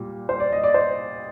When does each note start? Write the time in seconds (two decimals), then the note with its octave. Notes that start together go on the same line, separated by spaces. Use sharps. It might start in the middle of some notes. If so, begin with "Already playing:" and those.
Already playing: A#2 G3
0.29 C5
0.40 D5
0.52 D#5
0.64 D5
0.74 C5